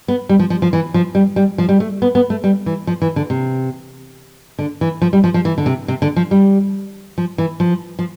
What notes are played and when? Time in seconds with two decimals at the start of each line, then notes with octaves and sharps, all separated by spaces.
0.08 B3
0.29 G3
0.39 F3
0.50 F3
0.62 F3
0.73 E3
0.94 F3
1.15 G3
1.36 G3
1.58 F3
1.69 G3
1.80 A3
2.02 B3
2.15 B3
2.30 A3
2.44 G3
2.66 E3
2.87 F3
3.02 E3
3.16 D3
3.30 C3
4.59 D3
4.81 E3
5.02 F3
5.13 G3
5.24 F3
5.34 F3
5.45 E3
5.58 D3
5.66 C3
5.88 C3
6.02 D3
6.16 F3
6.31 G3
7.18 F3
7.38 E3
7.60 F3
7.99 F3